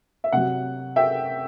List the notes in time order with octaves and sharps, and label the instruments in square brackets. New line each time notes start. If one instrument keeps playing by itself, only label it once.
[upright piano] E5
C3 F#3 F#5
E5 G5